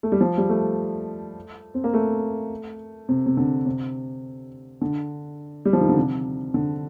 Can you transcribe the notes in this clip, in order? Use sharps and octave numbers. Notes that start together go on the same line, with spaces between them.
A3
G3
F3
G3
A3
C4
A#3
A3
C3
C3
D3
C3
D3
G3
F3
D#3
D3
C3
D3